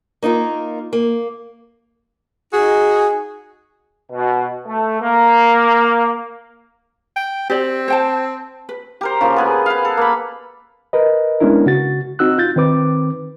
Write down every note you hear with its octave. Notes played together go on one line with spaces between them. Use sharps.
A#3 D#4 F4 A#4
A#3
D#4 F#4 G#4
B2
A3
A#3
G5
C4 G4 D5
C5 G5 A5
B4
G4 A#4 C5
C#3 F3 A#3
B3 G#4 B4
B4 F5
A4
A#3 B5
A#4 B4 D#5
G#3 B3 C#4 D4 E4 A#4
C#3 F#4 A6
C4 D#4 F#4 E6 F#6
F4 G6 A6
D#3 C4 B4 D6